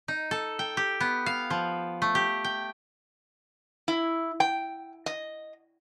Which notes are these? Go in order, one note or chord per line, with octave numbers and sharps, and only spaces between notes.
D#4
A4
G5
G4
B3
F5
F3
A3
G4
G5
E4
G5
D#5